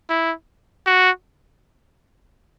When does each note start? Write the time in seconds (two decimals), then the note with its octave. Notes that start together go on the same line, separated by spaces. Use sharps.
0.09 E4
0.87 F#4